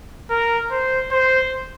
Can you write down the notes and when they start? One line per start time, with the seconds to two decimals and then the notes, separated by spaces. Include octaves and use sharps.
0.30 A#4
0.71 C5
1.11 C5